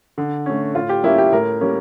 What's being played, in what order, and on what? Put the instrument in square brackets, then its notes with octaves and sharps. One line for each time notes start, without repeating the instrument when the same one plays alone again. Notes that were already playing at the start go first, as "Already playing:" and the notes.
[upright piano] D3
A3 C#4
A2 F4
G4
G3 A#3 C#4 E4
G4
A2 A#4
G3 A#3 C#4